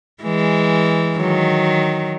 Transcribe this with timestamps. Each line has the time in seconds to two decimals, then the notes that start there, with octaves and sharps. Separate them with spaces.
0.23 E3 G#3
1.17 D#3 F#3